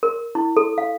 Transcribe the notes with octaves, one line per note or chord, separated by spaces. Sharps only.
A#4
E4
A4
F5